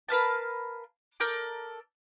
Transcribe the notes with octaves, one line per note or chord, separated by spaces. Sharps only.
A#4 B4 F5 A5
A4 A#4 D5 G6